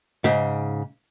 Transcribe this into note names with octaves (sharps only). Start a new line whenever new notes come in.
G#2 C#3